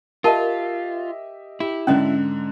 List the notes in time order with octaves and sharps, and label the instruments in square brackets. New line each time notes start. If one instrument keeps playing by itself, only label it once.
[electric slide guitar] F4 [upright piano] G4 D#5 E5 [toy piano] A#4 A5
[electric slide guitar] E4 [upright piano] G4
[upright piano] G#2 D3 F#6 [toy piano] C#4 D#5